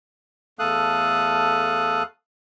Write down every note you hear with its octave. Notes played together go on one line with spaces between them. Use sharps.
E2 A3 A4 F5 D#6 F#6